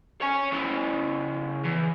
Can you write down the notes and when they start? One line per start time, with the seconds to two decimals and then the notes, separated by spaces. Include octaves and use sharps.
0.22 C#5 G#5
0.53 C#3 E4
1.65 E2